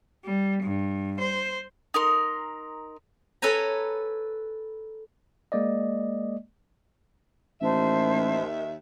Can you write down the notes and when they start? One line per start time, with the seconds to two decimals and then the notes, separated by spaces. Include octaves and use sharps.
0.24 G3
0.62 G2
1.20 C5
1.94 D#4 A#4 C6
3.42 A4 B4 C#5 G#5 A#5
5.52 G#3 A#3 D5 D#5
7.62 A1 D#2 D#3 C5 E5 A5